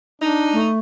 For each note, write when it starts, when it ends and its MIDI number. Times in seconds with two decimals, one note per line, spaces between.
0.22 0.58 62
0.22 0.68 63
0.53 0.79 57